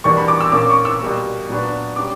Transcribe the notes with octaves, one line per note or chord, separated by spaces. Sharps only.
E2 B2 G3 A#3 D4 C#6
B5
D6
E6
A#2 A#3 C#4 D6
C#6
E6
B2 G3 A#3
A#2 F#3 B3 D4
G3 C#4 D6